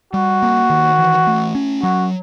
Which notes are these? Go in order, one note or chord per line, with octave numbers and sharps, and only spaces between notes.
G3 F#4
A#3
D#3
E3
A3
C#4
F#3 F#4